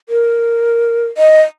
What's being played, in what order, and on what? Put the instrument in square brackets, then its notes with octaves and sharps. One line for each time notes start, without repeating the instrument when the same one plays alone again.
[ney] A#4
D#5